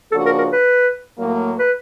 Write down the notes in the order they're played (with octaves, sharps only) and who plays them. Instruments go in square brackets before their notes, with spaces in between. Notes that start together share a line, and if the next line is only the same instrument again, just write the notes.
[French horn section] C#3 F3 A#3 D4 F#4 [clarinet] A4
[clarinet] A#4
A#4
B4
[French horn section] A2 F#3 A#3
[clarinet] B4